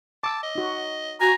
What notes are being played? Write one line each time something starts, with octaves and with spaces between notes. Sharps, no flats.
A5 D6 E6
D#5
D#4 F#4
F#4 G#5 A#5